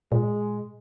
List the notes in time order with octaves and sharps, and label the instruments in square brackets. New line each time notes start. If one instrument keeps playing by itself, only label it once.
[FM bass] A#2 [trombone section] G#3